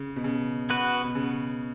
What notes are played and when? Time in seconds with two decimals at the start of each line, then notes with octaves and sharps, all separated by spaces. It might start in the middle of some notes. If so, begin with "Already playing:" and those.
Already playing: C#3
0.16 B2
0.24 C#3
0.70 B3 F#4 B4
1.04 B2
1.15 C#3